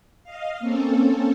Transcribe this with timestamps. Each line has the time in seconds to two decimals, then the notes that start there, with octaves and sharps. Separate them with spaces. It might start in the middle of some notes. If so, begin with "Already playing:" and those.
0.23 D#5 F5
0.59 A#3 C4 C#4 A4